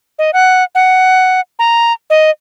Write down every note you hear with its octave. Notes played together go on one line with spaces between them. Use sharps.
D#5
F#5
F#5
A#5
D#5